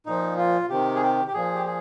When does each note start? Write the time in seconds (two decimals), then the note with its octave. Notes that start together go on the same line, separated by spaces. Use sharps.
0.06 A#2 F3 D#4
0.37 F4
0.69 C3 D#3 G4
0.95 G#4
1.02 G4
1.28 G4
1.34 A#2 F3 G#4
1.55 G4
1.66 G#4